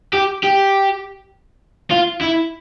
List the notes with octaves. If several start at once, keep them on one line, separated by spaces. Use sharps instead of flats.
G4
G4
F4
E4